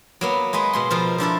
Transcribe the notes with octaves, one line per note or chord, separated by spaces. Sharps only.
F#3 A#3 B3
G#3 G#4 B4 D#5
B2 G#3 C6
B2 F3 A#4
F3 D4 E4 A4